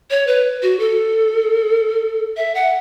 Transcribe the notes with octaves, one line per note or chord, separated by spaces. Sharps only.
C#5
B4
F#4
A4
E5
F#5